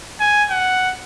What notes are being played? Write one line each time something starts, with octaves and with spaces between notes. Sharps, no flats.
G#5
F#5